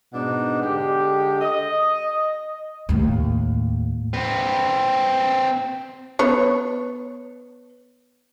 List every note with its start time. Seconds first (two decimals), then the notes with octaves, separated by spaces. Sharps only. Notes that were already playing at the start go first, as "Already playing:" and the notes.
0.14 G#2 B2 D4 D#4 F#5
0.62 D3 G#3 G4
1.40 D#5
2.89 D#2 A2
4.14 C4 B4
6.19 B3 C#5